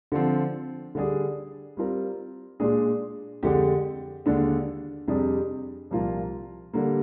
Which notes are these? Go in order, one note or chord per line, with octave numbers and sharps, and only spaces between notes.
D3 F3 C4
D3 G3 D4 G#4
G3 C4 F4 A#4
A#2 G#3 D4 G#4
F2 D3 G#3 D4 G4
D#2 D3 G#3 D4
F2 C3 G3 D4 G#4
C2 A#2 F3 A#3 F4
D3 G3 A#3